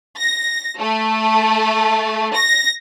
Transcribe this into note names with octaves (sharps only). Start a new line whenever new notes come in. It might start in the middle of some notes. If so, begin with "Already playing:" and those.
A#6
A3
A#6